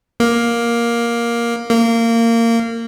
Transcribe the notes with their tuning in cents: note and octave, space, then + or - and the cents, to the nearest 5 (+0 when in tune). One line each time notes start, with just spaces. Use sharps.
A#3 +10
A#3 -20